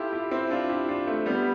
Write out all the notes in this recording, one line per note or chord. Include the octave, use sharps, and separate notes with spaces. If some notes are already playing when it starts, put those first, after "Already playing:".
Already playing: E4 F4 G4 A4
E4 G4
C4 E4
D4 F4
E4 G4
D4 F4
A3 C4
G3 B3